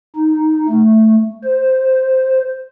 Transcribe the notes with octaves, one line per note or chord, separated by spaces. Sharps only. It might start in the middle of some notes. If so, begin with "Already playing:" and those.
D#4
A3
C5